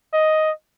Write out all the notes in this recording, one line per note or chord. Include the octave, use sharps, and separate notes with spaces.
D#5